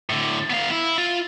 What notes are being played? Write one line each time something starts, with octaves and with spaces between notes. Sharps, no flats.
A2 D3
B3 F5
E4
F4